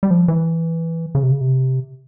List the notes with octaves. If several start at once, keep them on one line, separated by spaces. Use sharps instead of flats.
G3
F3
E3
C#3
C3
C#3
C3